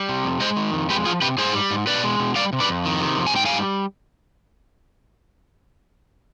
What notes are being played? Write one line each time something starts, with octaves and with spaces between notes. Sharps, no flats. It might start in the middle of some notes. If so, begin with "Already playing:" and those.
Already playing: G3
C3
F2
G#3 C5 D#5
D#3
F2
G#3 G4 B4
F3 F4 G#4
C3 G4 B4
G#2 G#4 C5
G3
G#2
B2 B4 D5
G#3
B2
G3 D5 F5
C3
B4 D5
F2
D#3
C3
F2
G#5
G#2 G5
G3 F5 G#5